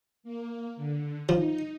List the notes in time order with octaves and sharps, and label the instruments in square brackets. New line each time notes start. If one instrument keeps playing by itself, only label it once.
[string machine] A#3
D3
[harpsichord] F3 [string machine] D#4